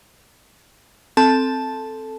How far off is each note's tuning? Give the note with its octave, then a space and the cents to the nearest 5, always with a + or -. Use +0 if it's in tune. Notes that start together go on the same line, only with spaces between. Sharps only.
C4 +0 A4 +0 A5 -5